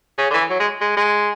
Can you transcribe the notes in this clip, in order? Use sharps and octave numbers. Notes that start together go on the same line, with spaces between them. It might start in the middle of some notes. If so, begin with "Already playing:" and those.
C#3
D3
E3
F#3
G#3
G#3
G#3